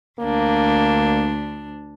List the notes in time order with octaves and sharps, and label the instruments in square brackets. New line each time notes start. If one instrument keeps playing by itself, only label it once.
[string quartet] D2 D4 [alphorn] A#3